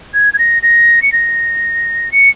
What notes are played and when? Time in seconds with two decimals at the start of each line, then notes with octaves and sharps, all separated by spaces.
0.14 G#6
0.34 G#6
0.39 A#6
0.63 A#6
1.02 C#7
1.12 A#6
2.12 C#7